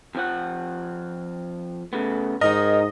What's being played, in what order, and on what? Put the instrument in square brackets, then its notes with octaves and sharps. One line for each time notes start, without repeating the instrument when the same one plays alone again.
[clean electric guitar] F2 F3 F#5
[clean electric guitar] C#3 B3 [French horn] A3
[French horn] G#2 [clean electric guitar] D#4 A#4 [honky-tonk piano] D#5